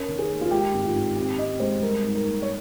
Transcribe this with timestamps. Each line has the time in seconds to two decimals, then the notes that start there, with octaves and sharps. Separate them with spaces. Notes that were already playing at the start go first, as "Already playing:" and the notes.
Already playing: C#4 A#4
0.08 D#3
0.19 G#4
0.29 A#3
0.41 F4
0.51 G#3 G4
0.74 G#1
0.84 F4
0.95 G#1
1.16 C4 G4
1.38 C4 D#5
1.60 G#3 C5
1.82 G3 A#4
2.04 G#2
2.15 A#4
2.25 A#3
2.42 C#5